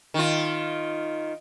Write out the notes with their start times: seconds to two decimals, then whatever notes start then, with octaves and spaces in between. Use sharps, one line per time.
0.14 D#3 F4